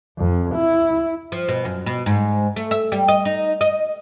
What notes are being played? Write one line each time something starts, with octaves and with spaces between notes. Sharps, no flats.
F2
E4
F3
B2
F#2
B2
G#2
A3
E5
G3
D#5
D#4
D#5